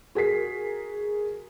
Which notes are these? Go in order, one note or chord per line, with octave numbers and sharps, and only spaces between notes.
F#4 G#4 A#4 B6 C7